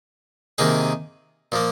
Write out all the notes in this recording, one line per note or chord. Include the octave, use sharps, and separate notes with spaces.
C3 D#3 A#3 D#4 G#4
A#2 F3 A#3